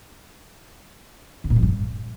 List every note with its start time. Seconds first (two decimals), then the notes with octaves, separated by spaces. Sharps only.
1.44 D3
1.50 A#2
1.56 F2
1.62 G2